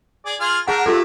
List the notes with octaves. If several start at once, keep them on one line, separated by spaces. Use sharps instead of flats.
G#4 D5
F4 G#4 F6
D4 G#4 A#4 F#5
A3 F4 G4 A4